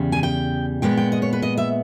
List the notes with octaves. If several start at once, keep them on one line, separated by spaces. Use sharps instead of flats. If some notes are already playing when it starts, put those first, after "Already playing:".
Already playing: E2 C#3 G3
G#5
G5
A#2 G#3 B3 G5
G5
D#5
C#5
B4
D#5
E5